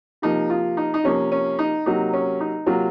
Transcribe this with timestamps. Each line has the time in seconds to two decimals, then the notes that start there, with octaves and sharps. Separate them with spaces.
0.22 C3 F3 A#3 D#4
0.50 F4
0.77 D#4
0.94 D#4
1.04 C3 F3 A#3 C#4
1.32 C#4
1.59 D#4
1.86 C3 F#3 A#3 D#4
2.13 C#4
2.40 D#4
2.66 C3 F#3 A#3 F4